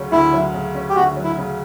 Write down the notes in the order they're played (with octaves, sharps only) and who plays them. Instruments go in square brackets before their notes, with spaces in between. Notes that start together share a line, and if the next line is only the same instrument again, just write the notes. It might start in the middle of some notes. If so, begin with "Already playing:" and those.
Already playing: [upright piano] D2 C#3 F#3 C#4
[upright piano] D2 [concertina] E4
[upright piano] F#3
C#3
C#4
[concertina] G4
[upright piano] D2 [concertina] F#4
[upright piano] F#3
[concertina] E4
[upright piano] C#3